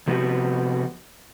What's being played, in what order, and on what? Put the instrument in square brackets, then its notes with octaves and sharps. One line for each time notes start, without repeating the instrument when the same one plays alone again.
[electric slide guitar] C3 F3 B3 F#4 G4